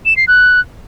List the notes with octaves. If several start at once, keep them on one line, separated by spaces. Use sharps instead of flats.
E7
C7
F#6